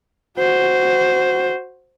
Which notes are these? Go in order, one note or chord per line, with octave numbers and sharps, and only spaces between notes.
F#4 C5